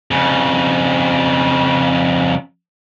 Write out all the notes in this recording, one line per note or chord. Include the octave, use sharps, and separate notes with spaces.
F2 C#3